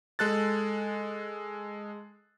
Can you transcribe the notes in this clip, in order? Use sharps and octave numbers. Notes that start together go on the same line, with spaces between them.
G#3 A4 F#6 A6